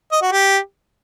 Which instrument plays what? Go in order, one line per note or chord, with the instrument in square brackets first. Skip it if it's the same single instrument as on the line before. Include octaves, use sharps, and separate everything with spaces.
[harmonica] D#5
F#4
G4